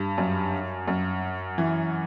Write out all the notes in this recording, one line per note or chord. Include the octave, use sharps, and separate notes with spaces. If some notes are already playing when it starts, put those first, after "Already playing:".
Already playing: G2
F#2
F#2
E3